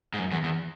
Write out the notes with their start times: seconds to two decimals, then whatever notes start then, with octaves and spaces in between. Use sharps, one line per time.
0.14 G#2
0.19 F#2
0.31 E2
0.44 E2